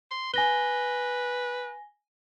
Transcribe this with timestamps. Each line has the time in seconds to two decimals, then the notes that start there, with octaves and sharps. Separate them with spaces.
0.11 C6
0.34 B4 G#5 A#6 G7